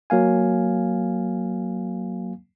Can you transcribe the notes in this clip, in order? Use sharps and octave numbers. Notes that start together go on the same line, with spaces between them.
F#3 A#3 F5 G#5